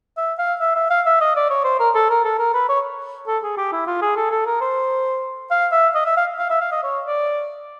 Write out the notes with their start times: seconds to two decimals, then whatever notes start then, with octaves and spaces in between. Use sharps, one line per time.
0.17 E5
0.38 F5
0.60 E5
0.75 E5
0.90 F5
1.06 E5
1.21 D#5
1.36 D5
1.50 C#5
1.64 C5
1.79 A#4
1.95 A4
2.10 A#4
2.25 A4
2.39 A#4
2.54 B4
2.69 C#5
3.27 A4
3.43 G#4
3.57 G4
3.72 E4
3.87 F4
4.02 G#4
4.16 A4
4.31 A4
4.46 A#4
4.61 C5
5.51 F5
5.72 E5
5.95 D#5
6.06 E5
6.17 F5
6.38 F5
6.50 E5
6.61 F5
6.72 D#5
6.84 C#5
7.06 D5